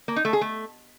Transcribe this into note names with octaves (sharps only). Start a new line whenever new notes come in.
A#3
D#4
A3
G#4
A3